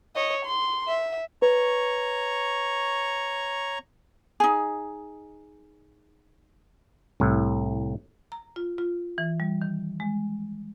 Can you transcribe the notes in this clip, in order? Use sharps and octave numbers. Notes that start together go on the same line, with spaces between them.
C#5 D#5
C6
E5
B4 C#5 A#5 C#6
D#4 G#4
C2 A2
A#5
F4
F4
E3
G3
D#3
G#3